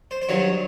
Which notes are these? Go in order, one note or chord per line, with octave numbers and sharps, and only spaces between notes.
C5
C5
G2 D#3 F#3 C#5